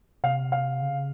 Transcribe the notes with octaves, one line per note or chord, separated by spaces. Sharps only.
C3 F5
F5
C#3